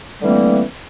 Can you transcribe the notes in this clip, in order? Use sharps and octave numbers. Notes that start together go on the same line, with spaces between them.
D3 E3 G3 A3 A#3 C4